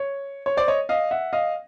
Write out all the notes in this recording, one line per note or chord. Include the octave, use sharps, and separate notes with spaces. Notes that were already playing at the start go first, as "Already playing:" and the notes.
Already playing: C#5
C#5
C5 D5
C#5 D#5
D#5 F5
E5 F#5
D#5 F5